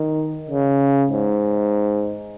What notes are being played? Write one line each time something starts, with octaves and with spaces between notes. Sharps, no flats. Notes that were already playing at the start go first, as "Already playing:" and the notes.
Already playing: D#3
C#3
G#2